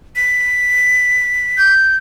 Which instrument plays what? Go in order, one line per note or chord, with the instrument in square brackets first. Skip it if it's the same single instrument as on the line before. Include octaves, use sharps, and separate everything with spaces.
[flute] B6
[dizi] G6